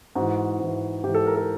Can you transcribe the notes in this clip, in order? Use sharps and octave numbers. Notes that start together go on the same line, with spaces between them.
G#2 E3 F#4
G#2 E3
G#2 E3 G4
A4
A#4
A4